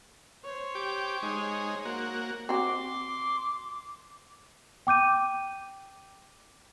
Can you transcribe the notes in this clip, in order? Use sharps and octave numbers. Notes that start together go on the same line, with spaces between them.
C5 C#5
G4 D6
G#3 D#4
A#3 F#4
C4 F#4 C6 D6
G5 D6 G6 D#7